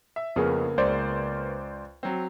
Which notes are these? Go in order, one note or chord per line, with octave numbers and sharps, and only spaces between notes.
E5
F2 C#3 A#3 B3 G#4
C#2 C5 D5
F#3 C4